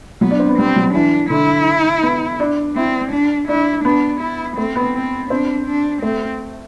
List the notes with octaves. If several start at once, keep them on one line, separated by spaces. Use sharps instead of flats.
F#3 B3
D4
C4
B3
G3 C4
F#3
E3 D4
D3 E4
B3
D4
C4 E4
D4
D4 E4
B3 D4
E4
A3 C4
B3
C4
C4 D4
D4
A3 C4